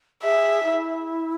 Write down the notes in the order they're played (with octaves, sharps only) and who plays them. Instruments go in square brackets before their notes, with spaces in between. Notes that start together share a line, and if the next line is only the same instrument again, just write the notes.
[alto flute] G#4 [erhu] E5
[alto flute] E4